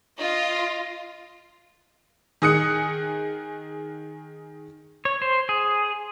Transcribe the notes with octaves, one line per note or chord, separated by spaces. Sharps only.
F4 D#5
D#3 G#4 D#6 F#6 C#7
C#5
C5
G#4